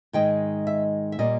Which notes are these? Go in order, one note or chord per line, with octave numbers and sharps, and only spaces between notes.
G#2 D#3 G#3 D#4 G5
E5
E5
A#2 G3 A#3 D#5